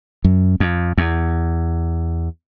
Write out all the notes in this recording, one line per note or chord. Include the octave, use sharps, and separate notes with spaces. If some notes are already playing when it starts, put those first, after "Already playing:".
F#2
F2
E2